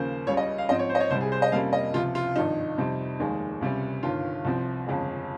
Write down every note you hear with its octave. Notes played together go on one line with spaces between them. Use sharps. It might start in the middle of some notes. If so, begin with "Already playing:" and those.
Already playing: D#2 C#3 F3 A#3 C#4 C5
C#2 C#3 G3 C#5
D#5
F5
G#2 F3 C4 D#5
C#5
C5
D#5
C#5
C2 C3 G3 C5
G#4
C5
D#5
F2 C3 G3 A#3 C#4 F5
D#5
C#2 C3 F3 F4
F4
G#1 G2 F3 D#4
F2 C3 G3 C4
F1 D#2 D#3 G#3
C#2 C3 G3 C#4
G1 G2 D#3 F4
C2 C3 F3 C4
G1 F2 C#3 G#3